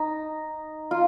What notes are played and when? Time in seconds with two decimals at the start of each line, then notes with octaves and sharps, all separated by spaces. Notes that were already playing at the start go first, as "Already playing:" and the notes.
Already playing: D#4
0.91 F4